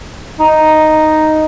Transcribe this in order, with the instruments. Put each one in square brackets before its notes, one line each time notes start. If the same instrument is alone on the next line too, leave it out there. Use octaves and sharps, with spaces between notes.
[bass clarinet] D#4